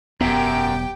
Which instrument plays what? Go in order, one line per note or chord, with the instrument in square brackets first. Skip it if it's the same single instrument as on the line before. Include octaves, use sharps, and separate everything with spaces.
[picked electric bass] E1 B3 [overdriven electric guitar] F#2 [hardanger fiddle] G4 G5